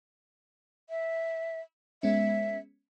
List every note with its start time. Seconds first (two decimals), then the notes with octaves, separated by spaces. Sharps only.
0.90 E5
2.03 G#3 B3 C#4 E5